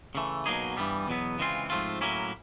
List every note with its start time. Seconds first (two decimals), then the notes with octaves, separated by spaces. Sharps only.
0.15 C#3 E3 A3
0.46 B2 F#3 A#3 D#4 G#4
0.77 G2 E3 G3 B3
1.08 E2 B2 F#3 B3
1.39 C#3 E3 G#3 C4 F4
1.70 G#2 F3 A3 C4 F4
2.01 A2 F#3 A#3 C#4 E4